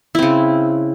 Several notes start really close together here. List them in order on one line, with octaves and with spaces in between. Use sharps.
E4 C4 C#3